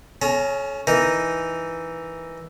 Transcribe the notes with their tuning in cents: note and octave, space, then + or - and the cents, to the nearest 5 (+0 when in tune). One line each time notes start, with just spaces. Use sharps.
C#4 +0 A4 -45 A#5 +0
E3 +0 D#4 +0 A#4 +0